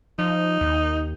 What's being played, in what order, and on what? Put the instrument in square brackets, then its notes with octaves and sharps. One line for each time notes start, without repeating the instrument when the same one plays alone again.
[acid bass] F3 [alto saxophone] D#4
[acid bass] D#2